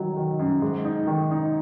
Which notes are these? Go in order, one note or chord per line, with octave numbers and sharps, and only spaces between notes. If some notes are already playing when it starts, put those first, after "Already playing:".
Already playing: D#3 F#3
D#3
F#2
G#2
D#4
D#3
D#4